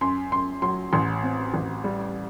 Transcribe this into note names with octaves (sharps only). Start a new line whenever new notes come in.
F#2 C6
F#2 C6
F#3 C6
A1 C6
C4
A1
G3